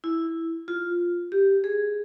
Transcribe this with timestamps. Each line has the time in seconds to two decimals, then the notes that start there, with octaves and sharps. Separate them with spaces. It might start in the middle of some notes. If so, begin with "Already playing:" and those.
0.04 E4
0.68 F4
1.32 G4
1.64 G#4